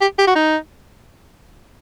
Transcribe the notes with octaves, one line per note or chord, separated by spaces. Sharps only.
G4
G4
F#4
D#4